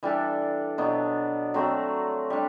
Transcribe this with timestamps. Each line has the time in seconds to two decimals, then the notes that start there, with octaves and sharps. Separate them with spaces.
0.03 E3 G3 D4 A4
0.78 B2 F#3 B3 D4
1.54 F#3 A3 C4
2.30 G3 D4